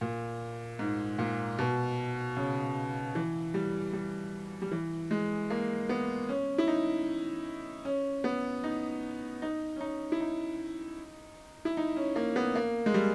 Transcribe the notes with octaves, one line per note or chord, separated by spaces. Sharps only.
A#2
G#2
A#2
B2
C#3
E3
G3
G3
G3
E3
G#3
A#3
B3
C#4
E4
D#4
C#4
B3
D#4
D#4
C#4
D#4
E4
D#4
E4
D#4
C#4
A#3
B3
A#3
G#3
G3